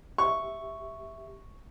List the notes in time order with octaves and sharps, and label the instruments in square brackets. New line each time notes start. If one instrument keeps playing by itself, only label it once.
[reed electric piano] G4 E5 [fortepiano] C#6